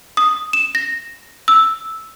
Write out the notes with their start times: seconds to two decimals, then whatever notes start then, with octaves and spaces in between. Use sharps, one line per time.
0.17 D#6
0.53 E7
0.75 A#6
1.48 E6